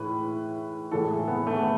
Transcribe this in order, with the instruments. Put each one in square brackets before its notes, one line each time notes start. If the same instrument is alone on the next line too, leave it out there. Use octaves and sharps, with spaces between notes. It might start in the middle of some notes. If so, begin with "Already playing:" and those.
Already playing: [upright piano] A2 E3 G#3 B4
A2 E3 G#3 A4
G#4
B3
A3
B3